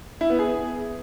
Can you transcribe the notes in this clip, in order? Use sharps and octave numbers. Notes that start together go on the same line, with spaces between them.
E4
B3
G#4